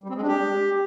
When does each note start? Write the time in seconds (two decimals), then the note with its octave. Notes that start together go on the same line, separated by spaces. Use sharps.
0.04 G3
0.10 C4
0.15 G#3
0.21 D4
0.27 G4